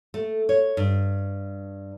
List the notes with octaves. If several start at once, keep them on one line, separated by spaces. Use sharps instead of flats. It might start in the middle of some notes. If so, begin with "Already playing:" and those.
A3
C#5
G2